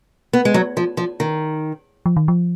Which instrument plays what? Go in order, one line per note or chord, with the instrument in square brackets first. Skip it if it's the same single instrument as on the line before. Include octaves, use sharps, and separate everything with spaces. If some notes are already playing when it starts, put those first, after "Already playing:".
[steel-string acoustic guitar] B3
G#3
F#3
F3
F3
D#3
[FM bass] F3
D#3
F3